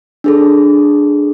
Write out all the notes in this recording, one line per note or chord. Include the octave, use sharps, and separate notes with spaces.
D4 G#4 A4